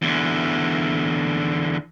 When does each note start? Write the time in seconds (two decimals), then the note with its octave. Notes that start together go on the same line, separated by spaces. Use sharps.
0.02 E2 D3